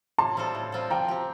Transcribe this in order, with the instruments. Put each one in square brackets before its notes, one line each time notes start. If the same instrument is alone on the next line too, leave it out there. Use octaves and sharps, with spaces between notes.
[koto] A2 [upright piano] A5 C6
[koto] G3 C4 F4 A4
A2
G3 C4 F4 A4
[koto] F3 [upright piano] G5 A#5
[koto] C4 G4